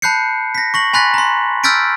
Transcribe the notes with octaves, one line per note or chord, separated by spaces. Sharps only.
A5 B5 F#6 G6 C7 C#7
A#6 B6
C#6 A#6 F#7
G#5 B5 C6 F#6 A6 B6
A#5 C6
E6 F6 G6 A6 B6 D7